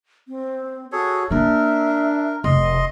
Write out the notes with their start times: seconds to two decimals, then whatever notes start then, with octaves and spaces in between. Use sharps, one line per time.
0.28 C4
0.92 F#4 G#4 A4 C#5
1.31 A#3 C4 D4 A#4 E5
2.44 F1 D#5 C6